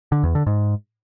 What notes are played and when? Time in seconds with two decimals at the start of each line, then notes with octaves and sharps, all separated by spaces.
0.12 D3
0.23 E2
0.35 D3
0.47 G#2